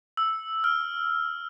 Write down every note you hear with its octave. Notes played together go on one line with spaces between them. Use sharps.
E6
F6